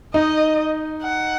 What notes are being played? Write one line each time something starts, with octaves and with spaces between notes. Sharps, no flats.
D#4 D#5
F#5